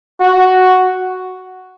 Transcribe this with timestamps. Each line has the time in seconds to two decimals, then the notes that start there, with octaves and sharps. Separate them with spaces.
0.20 F#4